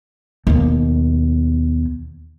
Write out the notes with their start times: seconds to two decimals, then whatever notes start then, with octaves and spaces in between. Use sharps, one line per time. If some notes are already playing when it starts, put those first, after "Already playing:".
0.47 D#2 B2